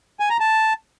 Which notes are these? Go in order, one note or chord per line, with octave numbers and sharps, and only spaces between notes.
G#5
A#5
A5